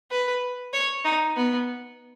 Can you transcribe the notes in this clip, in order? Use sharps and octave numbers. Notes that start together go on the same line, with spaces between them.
B4
C#5
D#4
B3